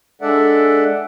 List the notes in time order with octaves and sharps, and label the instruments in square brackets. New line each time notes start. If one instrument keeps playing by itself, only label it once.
[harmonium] G#3 D4 A4 D5 E5 F#5